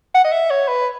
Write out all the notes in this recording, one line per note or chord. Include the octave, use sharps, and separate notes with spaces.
F#5
D#5
E5
C#5
B4